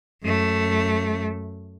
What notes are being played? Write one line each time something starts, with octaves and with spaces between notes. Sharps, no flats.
F#2 A3